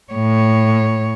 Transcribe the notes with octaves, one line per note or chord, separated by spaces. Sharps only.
A2 C#5